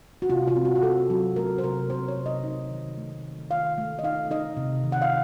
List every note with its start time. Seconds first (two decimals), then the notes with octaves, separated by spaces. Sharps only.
0.22 F#4
0.30 C3 F4
0.48 F4
0.56 C4
0.65 F#4
0.75 F#4
0.83 C4 A4
1.10 F#3 F#4
1.36 A3 A#4
1.58 C5
1.64 C3 A#4
1.90 C4 C5
2.08 C#5
2.17 C3
2.26 D#5
2.44 D#4
2.71 D#3
2.97 A3
3.24 D#3
3.50 D#3 F5
3.78 A3
3.99 D#5
4.04 D#4 F5
4.31 D#4 D#5
4.57 C3
4.84 D#3
4.92 F#5
5.02 F5